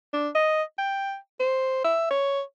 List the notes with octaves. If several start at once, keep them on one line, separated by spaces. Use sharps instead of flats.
D4
D#5
G5
C5
E5
C#5